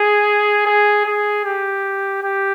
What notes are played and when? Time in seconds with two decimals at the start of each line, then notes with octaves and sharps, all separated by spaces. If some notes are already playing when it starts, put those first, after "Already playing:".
Already playing: G#4
0.66 G#4
1.06 G#4
1.45 G4
2.23 G4